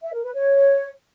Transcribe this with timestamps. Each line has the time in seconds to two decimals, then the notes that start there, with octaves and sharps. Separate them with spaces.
0.03 E5
0.13 A#4
0.24 B4
0.34 C#5